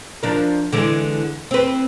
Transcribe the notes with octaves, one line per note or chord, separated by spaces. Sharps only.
F3 D4 A#4
D3 E3 G#3
C4 B4